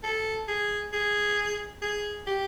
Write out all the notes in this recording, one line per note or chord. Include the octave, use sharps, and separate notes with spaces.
A4
G#4
G#4
G#4
G4